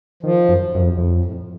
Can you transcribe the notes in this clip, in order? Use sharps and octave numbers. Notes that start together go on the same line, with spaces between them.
D#3 F3
F#2
F#2
F2
F2
A2